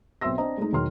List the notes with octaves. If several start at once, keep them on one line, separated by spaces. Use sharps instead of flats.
B1 C4 E5 C6 E6 A#6
C4 D4 C5 D#5 A#5
G#3 A3 D#4
E1 D#3 F#3 C#5 C6 F6